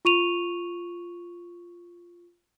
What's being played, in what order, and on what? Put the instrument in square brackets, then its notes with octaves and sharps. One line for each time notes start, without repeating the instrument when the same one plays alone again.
[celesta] F4 C#6 D#7 F7